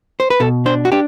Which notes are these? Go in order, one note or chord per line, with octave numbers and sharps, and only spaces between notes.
C5
B4
B2 A4
D4 C5
F#4
D4 G4